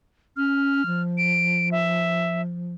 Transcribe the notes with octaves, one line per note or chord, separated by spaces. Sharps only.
C#4 F6
F3
D7
E5